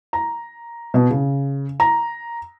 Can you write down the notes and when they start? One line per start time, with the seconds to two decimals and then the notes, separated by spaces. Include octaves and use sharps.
0.13 A#5
0.94 B2
1.11 C#3
1.80 A#5